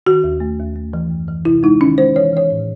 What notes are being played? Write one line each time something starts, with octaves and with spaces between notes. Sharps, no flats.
D#3 F#4
D#2
A3
D#2
A3
E3
F#2
E3
C3 E4
G#3 D#4
D#3 C#4
G#3 C5
E3 C#5
E3 C#5
A2